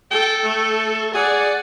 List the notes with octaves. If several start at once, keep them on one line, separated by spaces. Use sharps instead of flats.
A4 G5
A3
G#4 D5 F#5